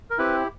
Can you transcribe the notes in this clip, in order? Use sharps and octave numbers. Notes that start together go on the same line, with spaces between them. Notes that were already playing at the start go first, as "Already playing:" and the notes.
A#4
C4 E4 G4 B4